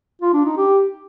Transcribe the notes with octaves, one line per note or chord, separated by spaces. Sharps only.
F4
D4
D#4
G4